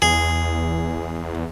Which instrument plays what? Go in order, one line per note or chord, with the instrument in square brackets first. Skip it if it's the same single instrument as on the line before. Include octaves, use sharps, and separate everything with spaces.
[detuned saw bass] E2 [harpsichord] G#4